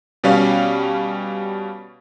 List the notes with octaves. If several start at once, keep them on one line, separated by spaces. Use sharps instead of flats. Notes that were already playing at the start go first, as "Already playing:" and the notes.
B2 G3 C#4 F5